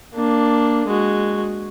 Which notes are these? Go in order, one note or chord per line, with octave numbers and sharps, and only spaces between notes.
A#3 D4
G#3 F#4